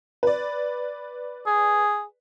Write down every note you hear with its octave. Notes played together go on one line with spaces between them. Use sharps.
B4 D5
G#4